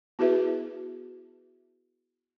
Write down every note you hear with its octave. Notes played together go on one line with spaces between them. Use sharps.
B3 E4 F#4 G#4 B4 E5